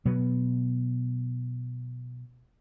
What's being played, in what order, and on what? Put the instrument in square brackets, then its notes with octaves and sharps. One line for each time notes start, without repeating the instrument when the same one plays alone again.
[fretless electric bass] B2 F#3 B3